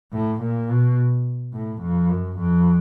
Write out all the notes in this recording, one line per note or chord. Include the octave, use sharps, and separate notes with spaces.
A2
A#2
B2
A2
F2
F#2
F2